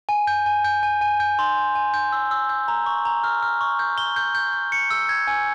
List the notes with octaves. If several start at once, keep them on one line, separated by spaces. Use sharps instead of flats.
G#5
G6
G#5
G6
G#5
G#5
G6
C6
G#5
G#5
G6
E6
E6
G6
A#5
C#6
A#5
F6
F6
C#6
G6
G7
G6
G6
G6
C#7
E6
G#6
G#5